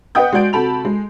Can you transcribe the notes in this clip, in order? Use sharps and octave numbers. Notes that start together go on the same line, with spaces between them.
B4 D#5 F#5 G5 D#6 G6
G#3 F#4 D5 G6 D7
C3 F#4 A4 A5 B5 F7
G#3